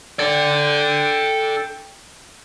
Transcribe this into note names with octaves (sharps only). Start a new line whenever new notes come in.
A4 D5 G5